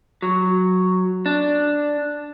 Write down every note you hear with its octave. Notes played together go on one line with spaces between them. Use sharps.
F#3
D4